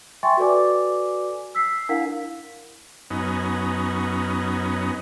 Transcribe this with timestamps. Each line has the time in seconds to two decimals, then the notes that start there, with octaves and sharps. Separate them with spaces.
0.23 E5 G5 G#5 C6 C#6 A6
0.37 F#4 A4 B4 D5 G#5 D6
1.55 E6 B6 C7
1.89 D4 E4 A#4 F5 F#5 B6
3.11 F#2 B3 C#4 D#4